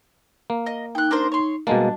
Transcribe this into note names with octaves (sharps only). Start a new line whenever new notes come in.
A#3
D#5
D#4 G5 F#6
D4 A#4 C5
C#5 C6
B2 G3 G#3 A#3 D4 F#4 D#5